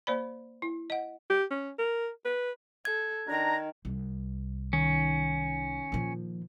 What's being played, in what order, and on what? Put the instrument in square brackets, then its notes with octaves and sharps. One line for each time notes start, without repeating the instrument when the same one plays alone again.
[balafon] A#3 C5 D5 B5
E4
D#5 F#5
[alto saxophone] G4
C#4
A#4
B4
[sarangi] A4 [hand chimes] G#6
[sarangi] D#3 [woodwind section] D4 A#5
[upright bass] C2
[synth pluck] D#3 [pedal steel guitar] C#4
[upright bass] A#2 F3